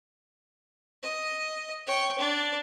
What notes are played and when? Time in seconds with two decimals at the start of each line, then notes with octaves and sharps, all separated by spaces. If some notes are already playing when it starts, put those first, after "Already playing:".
1.03 D#5
1.86 C#5 G5
2.18 D4 D5